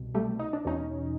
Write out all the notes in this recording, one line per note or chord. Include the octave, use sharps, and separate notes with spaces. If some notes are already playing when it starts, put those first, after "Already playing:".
Already playing: C2 B2
G3 A3
D#4
D4
E2 B2 C#4 D#4